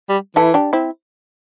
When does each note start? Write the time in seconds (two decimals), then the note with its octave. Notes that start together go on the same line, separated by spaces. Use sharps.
0.09 G3
0.36 E3 E4 A4
0.54 D4 G4
0.73 C4 E4